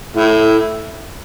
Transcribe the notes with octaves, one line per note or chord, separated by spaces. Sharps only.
A2 E4